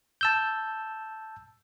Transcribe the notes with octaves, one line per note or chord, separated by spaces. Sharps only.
A5 E6 G6